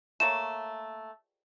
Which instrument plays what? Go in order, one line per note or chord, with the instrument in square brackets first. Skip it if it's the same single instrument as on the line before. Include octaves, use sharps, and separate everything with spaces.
[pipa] A3 A#3 C#5 [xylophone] E7